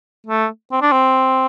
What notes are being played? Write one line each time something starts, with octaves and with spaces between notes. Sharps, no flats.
A3
C4
D4
C4